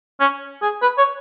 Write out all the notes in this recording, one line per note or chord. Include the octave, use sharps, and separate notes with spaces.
C#4
G#4
B4
C#5